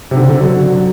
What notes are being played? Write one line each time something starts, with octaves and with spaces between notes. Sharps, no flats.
C3
D3
D3
F#3